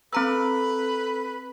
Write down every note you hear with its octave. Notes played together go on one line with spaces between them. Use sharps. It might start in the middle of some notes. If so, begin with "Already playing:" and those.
C4 A4 B4 A#5 E6